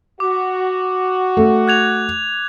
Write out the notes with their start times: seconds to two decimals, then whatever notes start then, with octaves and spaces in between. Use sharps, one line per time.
0.20 F#4 D6
1.37 A3
1.68 F#6 G#6 F7